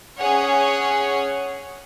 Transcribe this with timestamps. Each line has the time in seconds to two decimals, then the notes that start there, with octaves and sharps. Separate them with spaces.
0.17 C#4 G#4 C#5 F#5